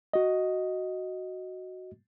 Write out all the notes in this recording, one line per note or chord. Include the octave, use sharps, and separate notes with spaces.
F#4 D#5